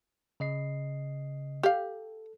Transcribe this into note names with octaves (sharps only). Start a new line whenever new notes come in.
C#3 D#5 C7
G4 A4 F5